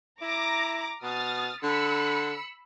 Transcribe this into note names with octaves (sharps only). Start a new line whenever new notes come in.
E4 A#5 D6 A#6
B2 D#6 F6 A6
D3 B5 E6 C#7